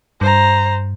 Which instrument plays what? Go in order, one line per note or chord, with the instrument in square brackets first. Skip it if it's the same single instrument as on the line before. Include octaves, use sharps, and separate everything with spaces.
[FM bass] G2 [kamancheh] C5 A#5